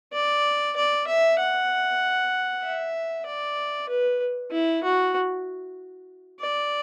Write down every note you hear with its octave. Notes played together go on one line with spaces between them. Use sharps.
D5
D5
E5
F#5
E5
D5
B4
E4
F#4
D5